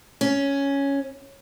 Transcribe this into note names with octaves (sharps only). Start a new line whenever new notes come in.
C#4